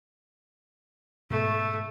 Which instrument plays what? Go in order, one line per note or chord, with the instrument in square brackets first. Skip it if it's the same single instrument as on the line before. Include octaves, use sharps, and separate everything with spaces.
[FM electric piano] G#2 B2 [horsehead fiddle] A3